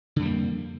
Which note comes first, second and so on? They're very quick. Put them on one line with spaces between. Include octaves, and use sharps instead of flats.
D3 F2 G3 A#3